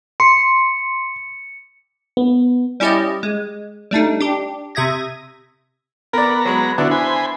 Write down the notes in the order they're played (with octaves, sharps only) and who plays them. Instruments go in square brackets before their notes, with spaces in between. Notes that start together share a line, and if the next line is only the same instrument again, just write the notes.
[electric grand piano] C6 [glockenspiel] C#7
[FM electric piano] B3
[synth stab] G3 C#4 E4 G4 D5 D#5
G#3
G3 A3 D4 D#4
D4 G4
C3 E5 D#6 G#6 A#6
[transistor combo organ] B3 A#5 [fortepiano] A#4 D5
[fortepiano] F#3 G#3
[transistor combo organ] D3 F#4 [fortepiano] B3 D4 E4
[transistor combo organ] C5 G#5 B5